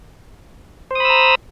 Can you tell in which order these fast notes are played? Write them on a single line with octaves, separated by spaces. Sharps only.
C5 D#6 B5 E6 A#5